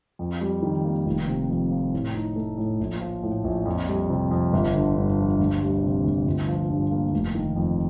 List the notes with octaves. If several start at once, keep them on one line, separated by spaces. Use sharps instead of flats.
F2
G3
D#3
A#3
F1
C3
F2
F3
A2
D#4
A3
A2
A#1
F3
A2
A#1
F2
G3
C3
F2
G1
D3
G2
F3
D2
G3
C3
D2
G1
F3
G2
A#3
F1
D#3
F2